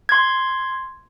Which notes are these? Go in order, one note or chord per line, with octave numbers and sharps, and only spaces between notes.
C6 G#6